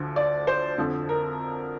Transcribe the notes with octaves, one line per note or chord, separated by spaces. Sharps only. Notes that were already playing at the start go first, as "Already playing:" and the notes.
Already playing: D2 D3 F3
D5
C5
F2 D3 F3
A#4